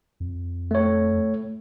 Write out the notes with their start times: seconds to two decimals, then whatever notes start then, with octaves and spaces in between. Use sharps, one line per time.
0.20 F2
0.71 A3 C#5